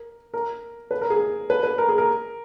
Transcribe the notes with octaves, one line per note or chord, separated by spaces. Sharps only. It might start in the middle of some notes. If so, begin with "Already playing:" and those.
Already playing: A#4
A#4
B4
A#4
G#4
B4
B4
A#4
G#4
A#4